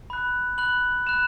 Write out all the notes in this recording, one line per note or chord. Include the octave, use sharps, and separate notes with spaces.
B5 F#6
B5 F#6 F#7
B5 F#6 E7